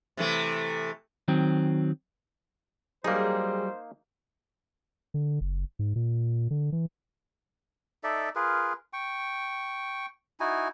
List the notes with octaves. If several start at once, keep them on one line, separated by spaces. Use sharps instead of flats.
C3 E3 A3
D#3 F#3 C4
F#3 G3 A#3 D#4 G#4 C5
D3
F#1
G#2
A#2
D3
E3
D#4 A4 D5 E5
F4 G#4 A#4 B4
G5 C#6
D#4 E4 F#4 G#5